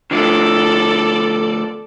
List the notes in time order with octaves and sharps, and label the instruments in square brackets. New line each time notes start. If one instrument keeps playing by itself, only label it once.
[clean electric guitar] D3 F3 A3 [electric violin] A4 D5